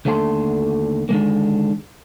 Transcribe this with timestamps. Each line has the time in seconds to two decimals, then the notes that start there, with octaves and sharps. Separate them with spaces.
0.05 D#2 D3 A3 A4 G5 C6
1.09 D3 D#3 G#3 A#3